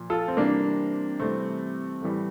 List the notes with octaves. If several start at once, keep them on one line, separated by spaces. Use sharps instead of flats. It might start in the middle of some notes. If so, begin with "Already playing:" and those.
Already playing: A#2 F3
F4 A4
C4
C3 E3 G3 A#3 D4
C3 E3 G3 A3 C4
A2 E3 G3